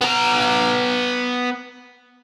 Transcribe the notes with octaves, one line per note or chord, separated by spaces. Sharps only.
B3 A#5